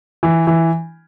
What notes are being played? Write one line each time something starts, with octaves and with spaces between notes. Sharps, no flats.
E3
E3